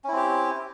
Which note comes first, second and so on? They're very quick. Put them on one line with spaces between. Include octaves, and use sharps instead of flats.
C#4 E4 C4 G4